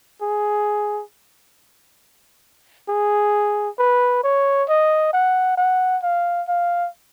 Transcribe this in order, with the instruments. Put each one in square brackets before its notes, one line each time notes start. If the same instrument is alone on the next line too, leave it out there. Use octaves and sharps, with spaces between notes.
[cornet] G#4
G#4
B4
C#5
D#5
F#5
F#5
F5
F5